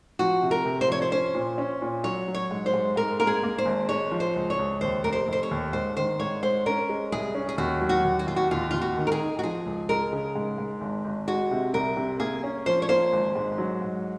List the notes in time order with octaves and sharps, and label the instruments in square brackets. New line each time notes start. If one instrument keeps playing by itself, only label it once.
[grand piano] F3 [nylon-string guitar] F#4
[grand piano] C3
[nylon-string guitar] A#4
[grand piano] C3
[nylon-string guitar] C5
[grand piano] F3 [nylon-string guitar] C#5
[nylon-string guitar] C5
[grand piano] C#4 [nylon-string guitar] C5
[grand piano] A#2
C#4
A#2
[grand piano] F#3 [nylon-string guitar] C#5
[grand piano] F#3
[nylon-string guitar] C#5
[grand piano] G#2
[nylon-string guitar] C5
[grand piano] G#2
[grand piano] G#2 [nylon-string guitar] A#4
[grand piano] A#3 [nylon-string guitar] A#4
[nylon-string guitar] G#4
[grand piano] A#3
[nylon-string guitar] C5
[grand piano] G#1
[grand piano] G#3 [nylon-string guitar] C#5
[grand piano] F3
[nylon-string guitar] C5
[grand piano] C#2
[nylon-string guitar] C#5
[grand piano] C#2
[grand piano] D#2 [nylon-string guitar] C5
[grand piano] F1 [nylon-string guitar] A#4
[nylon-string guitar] C5
[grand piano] F1 [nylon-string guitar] C5
[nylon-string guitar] C#5
[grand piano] D#2
[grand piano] G#2 [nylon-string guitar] C5
[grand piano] D#3 [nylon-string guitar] C5
[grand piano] G#2 [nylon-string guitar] C#5
[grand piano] G#2 [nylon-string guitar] C5
[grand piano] C#4 [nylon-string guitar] A#4
[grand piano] G#3
[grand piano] C2 [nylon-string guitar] G#4
[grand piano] C#4
[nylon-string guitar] G#4
[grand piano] D#2 [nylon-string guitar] F#4
[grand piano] F#3
[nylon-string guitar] F#4
[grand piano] D#2
[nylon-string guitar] F#4
[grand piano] D#2 [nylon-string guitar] F4
[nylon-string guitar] F#4
[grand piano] D#2 [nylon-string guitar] F4
[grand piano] D#2 [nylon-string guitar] F4
[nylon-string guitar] F#4
[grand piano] D#3
[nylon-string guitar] A#4
G#4
[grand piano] D#4
[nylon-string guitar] F#4
[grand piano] F3 [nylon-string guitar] G#4
[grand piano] C#2
[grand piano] G#3 [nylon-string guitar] A#4
[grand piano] C#3
G#2
G#2
G#1
G#1
[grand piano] G#3 [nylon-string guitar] F#4
[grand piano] C3
[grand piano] C2 [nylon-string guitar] A#4
[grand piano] C3
[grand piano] A#3 [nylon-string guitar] G#4
[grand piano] C#4
[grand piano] F3 [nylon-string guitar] C5
[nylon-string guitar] C#5
[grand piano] A#3 [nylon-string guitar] C5
[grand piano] G#1
G#2
F#3
G#2